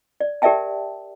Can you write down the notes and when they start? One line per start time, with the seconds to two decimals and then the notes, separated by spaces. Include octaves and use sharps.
0.20 D5
0.42 G4 A#4 D5 E5 G5 A5